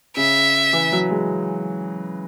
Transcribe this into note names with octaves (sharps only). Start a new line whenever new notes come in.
C#3 E5
E3
F#3
G#3